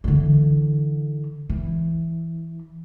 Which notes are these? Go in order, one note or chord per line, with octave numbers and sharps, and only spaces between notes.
D3 E3
E3